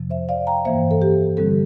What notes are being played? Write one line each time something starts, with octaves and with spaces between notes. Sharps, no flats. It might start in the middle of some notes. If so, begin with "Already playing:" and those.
Already playing: F2 C3 F3
C5 E5
D5 F5
G5 A#5
G2 E3 A#3 C5 E5
A4
G4
D3 G3 C4 A4